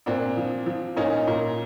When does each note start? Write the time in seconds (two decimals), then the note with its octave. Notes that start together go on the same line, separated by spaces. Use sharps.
0.06 A#2 C4 D4
0.37 F3
0.66 F3
0.97 A#2 C#4 D#4
1.28 A#2